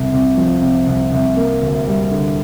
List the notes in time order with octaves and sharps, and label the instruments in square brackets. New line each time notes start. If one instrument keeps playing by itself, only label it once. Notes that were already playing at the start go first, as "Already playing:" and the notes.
Already playing: [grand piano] C2
C2
F3
C3
C2
C2
A#3
D2
G3
D3